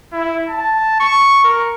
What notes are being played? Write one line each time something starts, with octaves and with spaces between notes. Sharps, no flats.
E4
A5
C#6
A#4